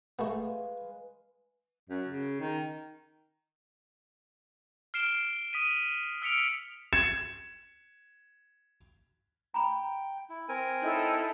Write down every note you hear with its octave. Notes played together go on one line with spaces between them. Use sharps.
G#3 A3 B3 B4 F5
F#2
C#3
D#3
F6 C7 D7 E7 G7
D#6 B6 D#7
E6 F6 B6 C#7 D7 F7
G#6 C#7 E7
G5 A#5 B5
E4
C4 A#4 G#5
D#4 E4 A4 C#5